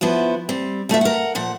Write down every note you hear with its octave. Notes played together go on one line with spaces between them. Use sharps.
F3 B3 E4 F#4
G3 C4
G3 A3 F4 E5
A#4 F#5
A#2 F3 F#5